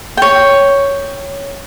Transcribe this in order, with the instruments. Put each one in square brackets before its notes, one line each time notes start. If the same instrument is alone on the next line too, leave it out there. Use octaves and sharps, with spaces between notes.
[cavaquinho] C#5 G5